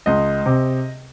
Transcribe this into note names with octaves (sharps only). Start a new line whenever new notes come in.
C#2 D#5
C3